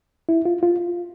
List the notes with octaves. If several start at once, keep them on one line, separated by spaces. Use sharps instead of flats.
E4
F4
F4